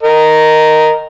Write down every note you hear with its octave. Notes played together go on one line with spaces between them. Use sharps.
A#4 D#5